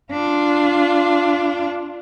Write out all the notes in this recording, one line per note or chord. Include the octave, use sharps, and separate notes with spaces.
D4 F4